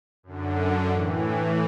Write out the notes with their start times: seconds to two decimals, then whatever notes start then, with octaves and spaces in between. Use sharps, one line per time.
0.23 F#2 D3
0.89 A2 E3